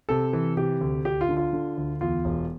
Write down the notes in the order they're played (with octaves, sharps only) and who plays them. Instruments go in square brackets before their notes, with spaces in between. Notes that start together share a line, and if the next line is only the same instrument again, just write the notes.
[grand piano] C3 A4
E3
C3 G4
D2
D2 G4
F4
D3
F4
D3
D2
E2 F4
E1